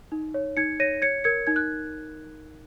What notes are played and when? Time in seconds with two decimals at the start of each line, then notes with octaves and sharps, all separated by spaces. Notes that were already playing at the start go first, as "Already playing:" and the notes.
0.12 D#4
0.34 C#5
0.57 D#4 G#6 C#7
0.80 C#5 A#6 D#7
1.02 C#5 G#6 C#7
1.24 A#4 G#6 C#7
1.47 D#4 G#6
1.56 F#6